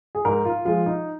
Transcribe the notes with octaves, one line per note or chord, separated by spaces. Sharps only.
G#4
G#2 A#4
F4
F3 G#3 F4
D#4